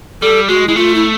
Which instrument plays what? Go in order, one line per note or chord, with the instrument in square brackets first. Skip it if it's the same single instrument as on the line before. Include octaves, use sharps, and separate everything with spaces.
[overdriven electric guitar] G3 [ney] A4
[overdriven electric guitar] G#3 [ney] F#4
[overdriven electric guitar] G#3 [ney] E4
[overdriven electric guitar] A3 [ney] F4
[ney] E4